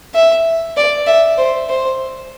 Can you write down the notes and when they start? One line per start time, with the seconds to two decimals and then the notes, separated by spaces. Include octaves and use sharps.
0.14 E5
0.77 D5
1.07 E5
1.38 C5
1.69 C5